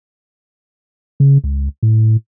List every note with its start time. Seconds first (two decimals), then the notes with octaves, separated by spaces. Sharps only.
1.20 C#3
1.44 C#2
1.83 A2